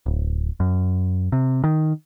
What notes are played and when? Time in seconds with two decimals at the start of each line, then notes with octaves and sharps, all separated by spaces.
0.06 D1
0.60 F#2
1.32 C3
1.64 D#3